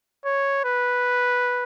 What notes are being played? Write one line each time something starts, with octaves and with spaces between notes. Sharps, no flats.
C#5
B4